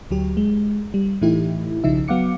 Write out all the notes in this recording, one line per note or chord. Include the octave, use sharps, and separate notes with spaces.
D2 F#3 G4
G#3
G3
A2 E3 A3 D#4 E4 G4
B1 C#3 F3 D#4 E5
F#3 B3 F5 F#5 D6 C#7